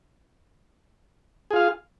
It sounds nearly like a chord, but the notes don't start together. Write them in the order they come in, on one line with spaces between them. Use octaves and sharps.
G#4 F4 F5